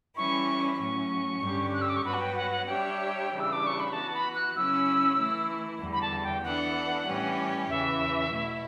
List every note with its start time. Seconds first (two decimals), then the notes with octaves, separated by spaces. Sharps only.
0.16 E3 G3 C#4 E4 C#6
0.78 A2 F#3 C#4 C#6
1.42 G2 D3 G3 C#4 G4
1.74 F#6
1.81 E6
1.89 D6
1.96 C#6
2.04 G2 F#3 B3 F#4 B4 B5
2.14 F#5
2.20 G5
2.36 F#5
2.51 F#5
2.67 G3 D4 G4 C#5 E5 G5
3.30 C#3 E3 G3 D4
3.40 E6
3.52 D6
3.66 C#6
3.80 B5
3.92 E3 B3 F#4 A5
4.14 B5
4.35 F#6
4.55 C#3 F#3 C#4 E4 E6
5.18 E3 A3 E4
5.81 E2 D3 G3
5.93 B5
6.02 A5
6.23 G5
6.44 E3 B3 D4 A4 F#5
7.06 A2 E3 G3 C#4 G4
7.69 E2 C#3 E3 E5
8.31 B2 A3 E4